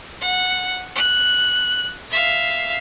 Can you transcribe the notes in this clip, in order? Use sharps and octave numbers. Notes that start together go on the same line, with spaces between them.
F#5
F#6
E5 F5